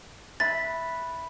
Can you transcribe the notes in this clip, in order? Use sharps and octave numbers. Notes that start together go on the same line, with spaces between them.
E5 B5 F#6 A6